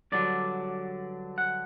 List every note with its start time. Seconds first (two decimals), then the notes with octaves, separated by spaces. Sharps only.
0.12 G2 D3 F#3 D5
1.38 F#5